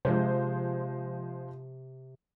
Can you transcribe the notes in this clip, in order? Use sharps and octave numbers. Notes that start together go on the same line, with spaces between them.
C3 F3 G#3 C5